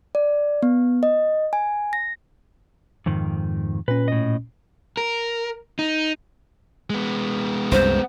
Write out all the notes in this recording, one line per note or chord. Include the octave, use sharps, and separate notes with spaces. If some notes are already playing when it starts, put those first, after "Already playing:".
D5
B3
D#5
G#5
A#6
F2 G#2 D#3
A#2 C#4 B4
A2 D#5
A#4
D#4
G#3 B3
C2 F#2 C3 C5